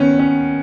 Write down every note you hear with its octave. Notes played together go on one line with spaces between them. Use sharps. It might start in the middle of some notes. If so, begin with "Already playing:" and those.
Already playing: D#3 B3 C#4
C#4